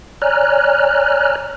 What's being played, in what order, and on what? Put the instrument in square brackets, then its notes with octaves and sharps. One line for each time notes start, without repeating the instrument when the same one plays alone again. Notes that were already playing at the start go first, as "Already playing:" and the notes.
[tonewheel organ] C#5 D5 G#5 A#5 F6 F#6